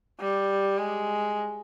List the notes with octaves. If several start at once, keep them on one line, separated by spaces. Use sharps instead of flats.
G3
G#3